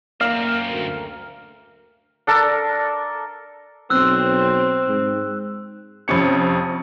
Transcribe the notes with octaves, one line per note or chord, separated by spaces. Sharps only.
F#2 A#3 C4 F5
D2 A#4
D4 A4 A#4
B1 C4 E6 F#6
G#2
F2 C3 C#4 C#7